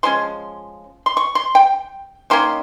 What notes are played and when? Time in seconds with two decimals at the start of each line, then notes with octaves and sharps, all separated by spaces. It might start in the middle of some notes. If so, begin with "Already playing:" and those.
0.03 F3 G#3 C#4 C6
1.06 C6
1.17 C#6
1.35 C6
1.55 G5
2.30 D#3 A#3 C#4 C6